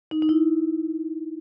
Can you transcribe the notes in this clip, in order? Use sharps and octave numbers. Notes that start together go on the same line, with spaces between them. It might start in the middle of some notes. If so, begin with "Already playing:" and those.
D#4
D#4
E4